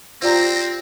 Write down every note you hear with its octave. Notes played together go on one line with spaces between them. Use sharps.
C4 F4 G4 C5 D5 A#5 A#6